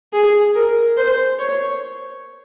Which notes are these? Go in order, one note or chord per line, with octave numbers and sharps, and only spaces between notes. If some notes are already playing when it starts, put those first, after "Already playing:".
G#4
A#4
C5
C#5